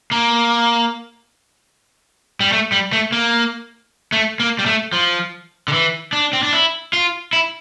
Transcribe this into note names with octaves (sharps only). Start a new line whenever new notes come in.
A#3
G3
A3
G3
A3
A#3
A3
A#3
G3
A3
F3
D3
E3
D4
C4
D4
E4
F4
E4